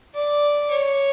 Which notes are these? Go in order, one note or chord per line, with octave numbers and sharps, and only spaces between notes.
D5
C#5